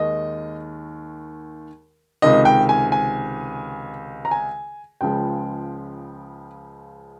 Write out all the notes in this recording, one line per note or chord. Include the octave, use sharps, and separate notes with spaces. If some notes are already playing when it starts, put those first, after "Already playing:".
Already playing: D#2 D#3 G#3 D#5
C#2 C3 D#3 D#5
G5
G#5
G#5
A#5
G#5
C#2 C#3 F3 G#3 G5